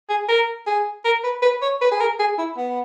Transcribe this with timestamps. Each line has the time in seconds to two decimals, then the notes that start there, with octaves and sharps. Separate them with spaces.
0.09 G#4
0.28 A#4
0.66 G#4
1.05 A#4
1.24 B4
1.42 B4
1.62 C#5
1.81 B4
1.91 G#4
2.00 A#4
2.19 G#4
2.38 E4
2.57 B3